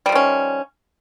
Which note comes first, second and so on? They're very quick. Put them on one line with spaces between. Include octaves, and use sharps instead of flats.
G3 F3 D#3 C#4